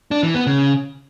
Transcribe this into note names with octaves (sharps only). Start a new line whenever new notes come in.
D4
E3
B3
C#3